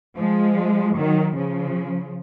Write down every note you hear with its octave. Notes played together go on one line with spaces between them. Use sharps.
F3 G#3
D#3 F#3
C#3 F3